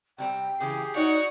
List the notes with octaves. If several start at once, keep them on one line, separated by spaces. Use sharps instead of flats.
C3 G3 C4 G5
C#3 E3 G4 G#4 C7
D#4 F#4 C#5 D5 F#5